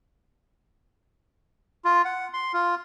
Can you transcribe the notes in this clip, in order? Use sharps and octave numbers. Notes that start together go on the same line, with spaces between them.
F4
F#5
C6
F4